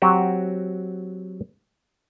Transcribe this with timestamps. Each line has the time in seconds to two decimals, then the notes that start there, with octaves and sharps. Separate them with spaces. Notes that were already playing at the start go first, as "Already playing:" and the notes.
0.02 F#3 C4 F#4 G4